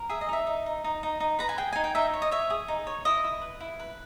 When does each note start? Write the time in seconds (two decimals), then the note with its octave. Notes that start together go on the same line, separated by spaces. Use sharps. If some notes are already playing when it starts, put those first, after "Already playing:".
Already playing: A#4
0.10 G#4 E5
0.21 D#5
0.29 D#4 E5
0.47 D#4
0.66 D#4
0.84 D#4
1.03 D#4
1.20 D#4
1.39 B4 A#5
1.49 G#5
1.58 G#4 G5
1.73 D#4 G#5
1.84 G5
1.95 D#4 E5
2.14 C#5
2.22 D#5
2.31 C#5 E5
2.50 G#4
2.68 D#4
2.87 C#5
3.05 E4 D#5
3.24 E4
3.42 B4
3.60 E4
3.80 B4